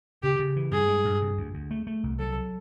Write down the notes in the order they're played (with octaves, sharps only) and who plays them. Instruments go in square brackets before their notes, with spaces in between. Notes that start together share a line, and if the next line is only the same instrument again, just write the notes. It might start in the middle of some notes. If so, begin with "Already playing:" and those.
[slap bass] C#3 [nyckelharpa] G4
[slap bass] C#3
E3
[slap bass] G2 [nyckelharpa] G#4
[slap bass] G#3
G2
C3
D2
D2
A3
A3
C2
[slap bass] F#3 [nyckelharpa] A4